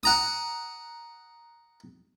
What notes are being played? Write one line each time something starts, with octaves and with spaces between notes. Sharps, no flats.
F#5 A#5 D#6